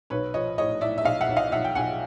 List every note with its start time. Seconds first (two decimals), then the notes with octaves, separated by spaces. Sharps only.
0.10 B1 B4 C#5
0.34 F3 C#5 D#5
0.58 A2 C#5 D#5
0.81 A2 D5 E5
0.98 E5
1.05 B1 D#5 F5
1.21 E5 F#5
1.29 B1
1.36 D#5 F5
1.52 B1 E5 F#5
1.65 G5
1.75 B1 F#5 G#5